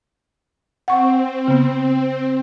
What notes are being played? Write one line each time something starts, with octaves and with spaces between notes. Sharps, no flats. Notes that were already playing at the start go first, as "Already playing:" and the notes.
C4 F#5 C#6
C#3 B3